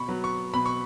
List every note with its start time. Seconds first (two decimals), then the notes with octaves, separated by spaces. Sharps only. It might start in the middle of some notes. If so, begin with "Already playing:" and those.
Already playing: B2 B5 C#6
0.08 F#3 B3
0.24 C#6
0.54 B2 B5
0.66 C#6